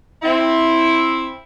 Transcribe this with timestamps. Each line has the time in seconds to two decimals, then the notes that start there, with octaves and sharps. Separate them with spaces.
0.23 C4 E4